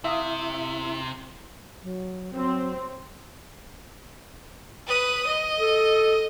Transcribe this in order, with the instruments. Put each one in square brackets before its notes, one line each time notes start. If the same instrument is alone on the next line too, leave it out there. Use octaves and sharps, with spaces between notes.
[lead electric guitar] C3 [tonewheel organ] E4 [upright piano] E5 F5 D#6
[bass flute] F#3
[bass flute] F#3 [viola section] C4
[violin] B4 D#6
D#5
[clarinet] A4